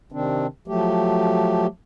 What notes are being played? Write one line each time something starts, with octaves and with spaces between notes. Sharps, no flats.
C3 D#3 C4 D4
F3 F#3 A3 G4